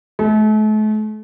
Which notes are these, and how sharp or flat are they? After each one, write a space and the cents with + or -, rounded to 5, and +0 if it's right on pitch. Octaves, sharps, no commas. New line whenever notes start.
A3 -40